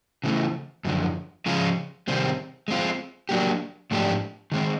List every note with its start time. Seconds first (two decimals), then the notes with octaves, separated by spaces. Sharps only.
0.24 C#3 E3 A3
0.85 F#2 D3 F3
1.46 C#3 F3 G#3 C#4 F4
2.08 C3 D#3 G3 C4
2.68 G#3 C4 F4
3.29 F#3 A#3 D4 G4
3.91 G#2 F3 A3 D4 G4
4.52 D#3 G#3 C4